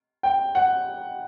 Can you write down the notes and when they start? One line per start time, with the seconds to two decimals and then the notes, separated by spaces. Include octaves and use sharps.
0.23 G5
0.55 F#5